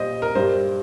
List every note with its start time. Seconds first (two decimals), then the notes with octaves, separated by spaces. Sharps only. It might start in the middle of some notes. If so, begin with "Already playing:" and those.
Already playing: A#2 G3 C5 D#5
0.22 A#4
0.35 G2 G3 C5